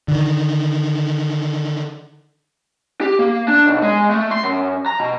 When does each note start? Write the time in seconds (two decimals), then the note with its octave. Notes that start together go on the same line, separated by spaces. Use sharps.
0.08 D3 D#3
3.01 G4
3.19 A#3
3.48 D4
3.66 B1
3.82 G#3
4.10 A3
4.31 C6
4.43 F#2
4.86 A#5
5.00 B2